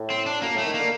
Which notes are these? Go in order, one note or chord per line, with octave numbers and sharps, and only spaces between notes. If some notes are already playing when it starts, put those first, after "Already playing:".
Already playing: A2
C4
D4
F#2 A#3
A2 A3
D#3
D3 A#3